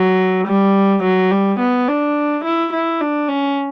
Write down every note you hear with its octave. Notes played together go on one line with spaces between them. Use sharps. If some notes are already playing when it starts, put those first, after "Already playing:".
Already playing: F#3
G3
F#3
G3
B3
D4
E4
E4
D4
C#4